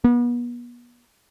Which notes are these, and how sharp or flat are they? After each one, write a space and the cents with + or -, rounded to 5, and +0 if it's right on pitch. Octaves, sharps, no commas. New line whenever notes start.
B3 -35